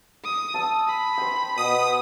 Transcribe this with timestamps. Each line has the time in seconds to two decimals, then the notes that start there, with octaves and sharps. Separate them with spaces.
0.24 D#6
0.54 A5 E6
0.88 B5
1.18 C5 G5
1.57 B2 D#6